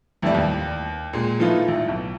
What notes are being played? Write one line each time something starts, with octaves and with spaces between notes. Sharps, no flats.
A1 F2 A2 E3 G3 D5
D#2
A#2 G#3
E3 F3 A3 D#4 F4 B4
A1
B1